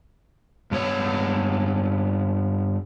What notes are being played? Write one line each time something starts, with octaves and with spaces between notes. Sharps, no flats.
G2 B3 C#5